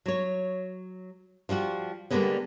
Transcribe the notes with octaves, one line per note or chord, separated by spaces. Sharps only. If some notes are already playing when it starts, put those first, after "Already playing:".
F#3 C#5
F3 G3 F4 F#4
D3 G3 G#3 A#3 B3 C#4